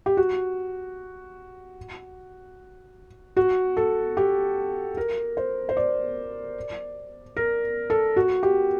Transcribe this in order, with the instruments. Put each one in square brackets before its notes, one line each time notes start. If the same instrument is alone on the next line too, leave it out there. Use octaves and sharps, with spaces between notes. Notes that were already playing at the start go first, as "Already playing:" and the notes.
[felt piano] G4
F#4
F#4
A4
G4
A#4
C5
C5
D5
A#4
A4
F#4
G4